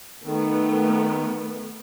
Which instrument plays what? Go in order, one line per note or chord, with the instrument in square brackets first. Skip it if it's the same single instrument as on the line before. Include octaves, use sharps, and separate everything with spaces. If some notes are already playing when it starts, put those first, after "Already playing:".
[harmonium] D#3 [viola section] A3 B3